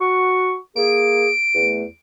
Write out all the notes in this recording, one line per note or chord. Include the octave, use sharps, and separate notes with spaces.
F#4 F#5 C#6
A#3 G#4 D7
E2 A3